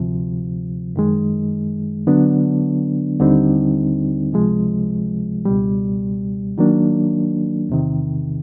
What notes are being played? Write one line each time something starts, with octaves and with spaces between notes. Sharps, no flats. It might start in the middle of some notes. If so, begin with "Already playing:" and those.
Already playing: D2 C3 F3
F#2 D#3 G#3
D3 F#3 B3 D4
D#2 D3 G3 C4 D#4
C#2 C3 F3 G#3
C#2 B2 G3
D#3 F#3 A#3 D4
E2 C3 D#3